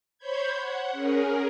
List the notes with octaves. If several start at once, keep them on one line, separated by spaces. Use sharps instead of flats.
C5 C#5 B5 G6 G#6
F#5
C#4 G#4 A#4